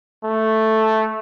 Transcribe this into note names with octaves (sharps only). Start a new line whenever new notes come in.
A3